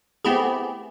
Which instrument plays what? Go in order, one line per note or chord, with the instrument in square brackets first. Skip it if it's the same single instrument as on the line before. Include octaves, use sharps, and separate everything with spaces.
[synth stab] A3 B3 C4 E4 G4 G#4